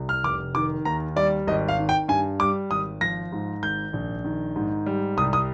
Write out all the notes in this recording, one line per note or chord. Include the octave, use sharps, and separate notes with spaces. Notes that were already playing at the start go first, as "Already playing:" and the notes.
Already playing: C2
F6
F1 D6
D#3 D6
D#2 A#5
G3 D5
G#1 D#5
F5
D#3
G5
G2 G#5
G3 D6
G#1 D#6
F3 A#6
G#2
G#1 G6
A#1
D#3
G#2
G3
C2 D#6
D#6